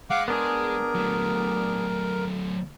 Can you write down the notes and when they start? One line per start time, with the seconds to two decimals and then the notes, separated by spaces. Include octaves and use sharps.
0.10 G#3 F5 F#5 D6
0.28 B3 D4 G#4 A#4
0.94 F#3 A3